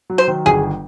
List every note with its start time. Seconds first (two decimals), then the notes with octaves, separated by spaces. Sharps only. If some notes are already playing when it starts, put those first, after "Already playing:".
0.10 F#3
0.18 C5
0.28 D#3
0.46 G1 G#4